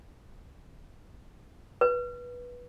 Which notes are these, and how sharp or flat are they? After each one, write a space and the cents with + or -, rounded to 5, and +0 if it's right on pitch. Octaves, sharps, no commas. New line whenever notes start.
B4 -15